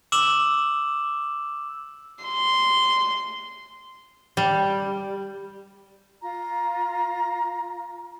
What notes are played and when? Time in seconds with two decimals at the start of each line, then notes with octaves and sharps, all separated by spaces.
0.12 D6 E6 E7 F#7
2.24 C6
4.37 G3
6.21 F4 A#5